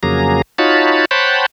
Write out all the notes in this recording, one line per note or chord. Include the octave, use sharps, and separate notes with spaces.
F2 C#3 F#3 A#3 G#4 A#5
D#4 F4 F#4 C#5 A5 B5
C5 C#5 F#5 G5 A5 B5